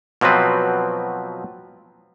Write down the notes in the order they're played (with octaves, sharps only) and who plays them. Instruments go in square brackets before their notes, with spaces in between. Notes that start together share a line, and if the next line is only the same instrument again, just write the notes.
[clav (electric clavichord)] B2 F3 F#3 C4 B4